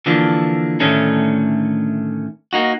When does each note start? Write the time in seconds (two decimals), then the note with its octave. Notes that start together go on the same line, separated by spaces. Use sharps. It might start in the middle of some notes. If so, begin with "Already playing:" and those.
0.06 D3 E3 F3 A#3 D4
0.80 A2 D3 D#3 A3 C#4 D4
2.53 A#3 D#4 F#4